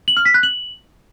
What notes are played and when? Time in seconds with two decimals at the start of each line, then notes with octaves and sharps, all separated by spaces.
0.08 F#7
0.17 F6
0.25 B6
0.34 F#6
0.43 F#7